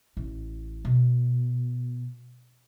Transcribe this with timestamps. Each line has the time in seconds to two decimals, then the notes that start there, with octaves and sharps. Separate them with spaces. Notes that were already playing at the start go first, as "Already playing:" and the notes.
0.17 A1
0.85 B2